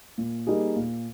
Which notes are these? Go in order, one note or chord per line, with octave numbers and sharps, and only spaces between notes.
A#2
G3 A#3 D#4 G#4
A#2